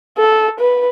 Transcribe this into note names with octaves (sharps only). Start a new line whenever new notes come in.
A4
B4